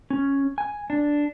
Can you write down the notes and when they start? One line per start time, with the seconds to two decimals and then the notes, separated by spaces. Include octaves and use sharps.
0.10 C#4
0.58 G#5
0.90 D4